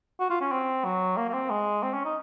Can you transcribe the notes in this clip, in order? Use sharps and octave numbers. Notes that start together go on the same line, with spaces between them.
F#4
F4
C#4
C4
F#3
A#3
A#3
C4
G#3
C4
C#4
D#4